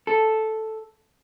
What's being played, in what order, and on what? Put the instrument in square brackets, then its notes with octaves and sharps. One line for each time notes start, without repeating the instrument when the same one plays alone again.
[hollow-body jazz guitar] A4